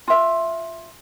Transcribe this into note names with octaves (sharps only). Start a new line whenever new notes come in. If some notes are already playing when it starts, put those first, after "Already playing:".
F4 E5